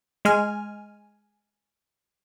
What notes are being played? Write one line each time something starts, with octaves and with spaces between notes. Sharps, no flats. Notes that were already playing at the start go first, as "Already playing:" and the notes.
G#3 G#5 F6